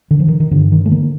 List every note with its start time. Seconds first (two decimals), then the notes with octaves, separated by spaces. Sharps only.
0.11 D3 D#3
0.20 F3
0.28 D#3
0.40 D#3
0.51 G2 D3
0.72 D#3
0.86 A3
0.91 D3 A#3